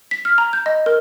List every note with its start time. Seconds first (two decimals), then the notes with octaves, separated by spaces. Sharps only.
0.11 B6
0.25 F6
0.38 A#5
0.53 G6
0.66 D#5
0.86 A#4